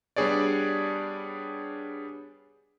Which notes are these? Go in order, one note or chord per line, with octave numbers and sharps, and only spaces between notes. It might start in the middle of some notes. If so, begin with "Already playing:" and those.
G3 B3 D4 G#4 C#5 D5